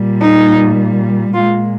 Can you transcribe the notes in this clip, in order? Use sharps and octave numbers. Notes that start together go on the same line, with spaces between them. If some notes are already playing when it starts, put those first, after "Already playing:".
Already playing: A#2 G3
D#4
A#2 G#3 F4